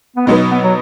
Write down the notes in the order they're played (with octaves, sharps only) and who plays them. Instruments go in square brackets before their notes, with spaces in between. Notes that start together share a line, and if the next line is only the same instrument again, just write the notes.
[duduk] B3
[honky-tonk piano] B2 F#3 D#4 B4 [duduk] G#3
[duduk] B3
F#3